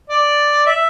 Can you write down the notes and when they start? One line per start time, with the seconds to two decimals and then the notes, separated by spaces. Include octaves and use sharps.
0.10 D5
0.66 E5